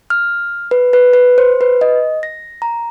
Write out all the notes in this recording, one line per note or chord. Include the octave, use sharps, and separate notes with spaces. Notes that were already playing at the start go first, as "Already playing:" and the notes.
F6
B4
B4
B4
C5
B4
D#5
A#6
A#5